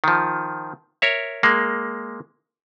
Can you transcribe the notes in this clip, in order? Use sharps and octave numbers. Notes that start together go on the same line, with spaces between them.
D#3 F3
A#4 C#5 E5
G#3 A#3